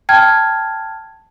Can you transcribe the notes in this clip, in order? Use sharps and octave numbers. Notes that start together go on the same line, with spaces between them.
G5 A5 F6 G#6